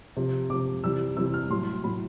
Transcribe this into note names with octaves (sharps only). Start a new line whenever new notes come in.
C3 F3
C3 F3 D6
C3 E3 G3 E6
C3 E3 G3 E6
F6
A2 F#3 C6
A2 F#3 B5